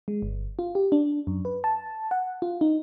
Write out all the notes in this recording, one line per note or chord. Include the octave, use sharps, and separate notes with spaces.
G#3
G1
F4
G4
D4
F#2
B4
A5
F#5
F4
D#4